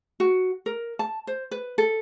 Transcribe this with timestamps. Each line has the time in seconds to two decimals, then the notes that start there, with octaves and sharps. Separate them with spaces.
0.20 F#4
0.66 A#4
0.99 A5
1.27 C5
1.51 B4
1.78 A4